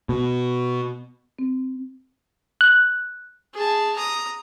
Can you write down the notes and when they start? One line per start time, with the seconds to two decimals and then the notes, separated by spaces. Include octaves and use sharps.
0.09 B2
1.39 C4
2.61 F#6
3.54 G#4 A5
3.96 A#5 D#6